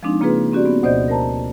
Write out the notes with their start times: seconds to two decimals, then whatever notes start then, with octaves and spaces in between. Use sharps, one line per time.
0.03 F3 G#3 C4 D4 D#4
0.20 C#3 A#3 C4 F4 G#4 B4
0.53 C4 C#4 F#4 G4 D5
0.66 B3
0.83 D2 B2 C5 D5 D#5 G6
1.08 A#4 C5 A5 A#5